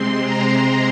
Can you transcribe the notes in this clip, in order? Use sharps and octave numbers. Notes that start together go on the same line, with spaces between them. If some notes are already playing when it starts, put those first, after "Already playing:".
Already playing: C3 G#3 C4 C6
A#5